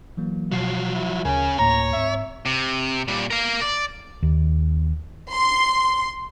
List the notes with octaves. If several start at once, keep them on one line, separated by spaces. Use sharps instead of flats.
E3 F#3 A#3
B2 F3 F#3 C7
E4
D2 C#3 C#4 A#4 G#5
D2 A2 A#3 C#5 A#5
G#2 C4 E5
C3
A#2 G3
A#4 F5
D5
D#2
C6